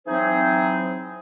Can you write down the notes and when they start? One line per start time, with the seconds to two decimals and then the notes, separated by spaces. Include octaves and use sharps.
0.07 E3 F#3 C4 D#4 G#4 C5